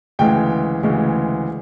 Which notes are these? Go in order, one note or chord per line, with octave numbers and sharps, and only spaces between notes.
D2 C#3 E3 G#3 G5
D2 C#3 E3 G#3